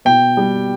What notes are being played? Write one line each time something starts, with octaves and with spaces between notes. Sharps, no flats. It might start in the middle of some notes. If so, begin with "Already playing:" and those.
B2 G5
G3